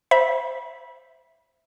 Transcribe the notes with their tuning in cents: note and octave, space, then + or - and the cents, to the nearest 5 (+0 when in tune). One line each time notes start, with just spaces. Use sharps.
C5 -5 E5 +0 B5 -35